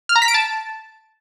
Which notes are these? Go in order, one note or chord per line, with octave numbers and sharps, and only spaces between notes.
F6
A#5
B6
D7
A5